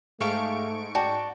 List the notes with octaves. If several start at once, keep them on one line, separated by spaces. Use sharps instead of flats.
G#2 A3 G4 A4 F5 C#6 D7
F#4 D5 G5 A5